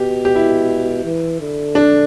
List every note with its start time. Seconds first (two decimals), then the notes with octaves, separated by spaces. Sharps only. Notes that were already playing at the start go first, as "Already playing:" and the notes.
Already playing: B2 G4
0.25 G4
0.36 E4
1.05 E3
1.40 D3
1.75 D4